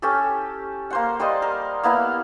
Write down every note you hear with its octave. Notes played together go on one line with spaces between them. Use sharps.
C#4 G4 A4
A#3 C5 F#5
G3 C5 D5 D#5
A#4
A#3 B3 E4 F5